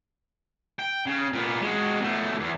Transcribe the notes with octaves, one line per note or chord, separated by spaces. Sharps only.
G5
C#3
A#2 B3
G#3 F#4
B2 A3
E2